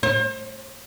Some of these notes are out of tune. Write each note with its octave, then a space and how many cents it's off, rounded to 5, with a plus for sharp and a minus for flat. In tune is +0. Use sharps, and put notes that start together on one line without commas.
C5 +35